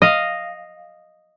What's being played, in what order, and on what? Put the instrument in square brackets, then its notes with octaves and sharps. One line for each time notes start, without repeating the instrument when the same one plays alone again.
[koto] D#5 F5